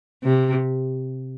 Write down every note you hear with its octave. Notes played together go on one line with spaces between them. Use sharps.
C3